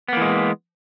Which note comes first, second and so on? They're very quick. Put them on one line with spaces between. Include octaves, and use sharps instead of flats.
B3 A#3 E3 G#3